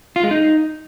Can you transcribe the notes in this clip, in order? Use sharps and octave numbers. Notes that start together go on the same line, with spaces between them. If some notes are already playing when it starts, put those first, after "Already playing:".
F4
G#3
D#4